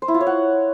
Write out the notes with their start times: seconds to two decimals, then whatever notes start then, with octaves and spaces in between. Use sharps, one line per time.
0.02 C5
0.08 E4
0.14 F4
0.20 C#5
0.27 F#5